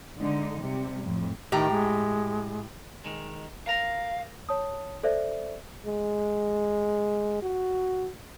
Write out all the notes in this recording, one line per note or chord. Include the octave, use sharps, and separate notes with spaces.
D3 G#3 D#4
C3 G3
F2 A2
A2 D#3 G4 A#5
G#3
D#3 G#3
A#4 F5 A#5
C#5 A5 D#6
A4 C5 D5 E5
G#3
F#4